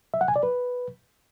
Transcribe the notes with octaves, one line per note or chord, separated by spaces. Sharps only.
E5
F#5
G#5
D5
B4